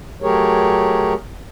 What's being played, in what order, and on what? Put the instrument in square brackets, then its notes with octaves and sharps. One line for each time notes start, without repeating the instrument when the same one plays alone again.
[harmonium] F#3 A3 G4 G#4 A#4 C#5